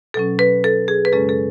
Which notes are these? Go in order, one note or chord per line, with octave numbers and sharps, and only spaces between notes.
B2 F#3 C#4 A4
B4
A4
G#4
B4
F#2 C#3 G#3 C#4 A4
A4